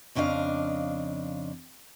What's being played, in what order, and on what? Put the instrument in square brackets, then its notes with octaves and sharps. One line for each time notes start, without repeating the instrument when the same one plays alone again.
[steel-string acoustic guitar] F2 C#3 D4 D#5 F5